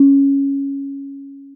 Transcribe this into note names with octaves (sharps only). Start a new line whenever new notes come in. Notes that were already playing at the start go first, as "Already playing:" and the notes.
Already playing: C#4